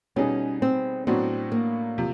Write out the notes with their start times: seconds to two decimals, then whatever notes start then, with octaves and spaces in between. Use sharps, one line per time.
0.16 B2 G3 B3 C#4 D#4 G#4
0.62 C4
1.07 A2 F#3 B3 C4 D4 F#4
1.52 A#3
1.98 C3 F3